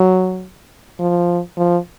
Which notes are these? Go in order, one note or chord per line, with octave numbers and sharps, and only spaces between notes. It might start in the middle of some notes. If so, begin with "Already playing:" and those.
Already playing: F#3
F3
F3